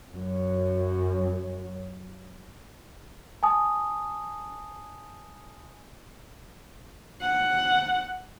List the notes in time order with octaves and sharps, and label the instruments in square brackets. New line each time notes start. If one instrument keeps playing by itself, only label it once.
[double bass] F#2 F#3
[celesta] G#5 A5 D#6
[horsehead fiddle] F#5